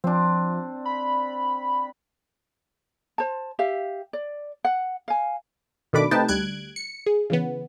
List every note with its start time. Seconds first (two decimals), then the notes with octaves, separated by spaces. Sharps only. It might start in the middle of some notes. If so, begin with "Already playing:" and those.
0.04 F3 C4 D4
0.85 B5
3.18 C5 A5
3.59 G4 E5 F5
4.13 D5
4.65 F#5
5.08 F5 G#5
5.93 B2 D#3 A3 D4 B5 D6
6.11 C3 A3 D#4 B4 G5 A5
6.28 D2 G3 F#6 G#6 D7
6.76 C#7
7.06 G#4
7.30 C#3 E3 B3